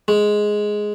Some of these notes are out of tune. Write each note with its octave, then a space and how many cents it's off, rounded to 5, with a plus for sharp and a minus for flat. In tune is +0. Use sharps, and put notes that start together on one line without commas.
G#3 +5